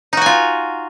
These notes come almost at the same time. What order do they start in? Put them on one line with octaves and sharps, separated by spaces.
D#4 F#4 G#5 F4